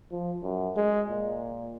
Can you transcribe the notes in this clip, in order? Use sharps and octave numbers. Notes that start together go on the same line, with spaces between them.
F3
F#2
G#3
A#2